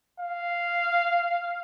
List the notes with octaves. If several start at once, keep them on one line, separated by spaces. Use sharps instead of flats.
F5